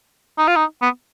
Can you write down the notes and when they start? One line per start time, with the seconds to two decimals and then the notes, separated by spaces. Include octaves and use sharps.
0.38 D#4
0.48 F4
0.56 D#4
0.82 B3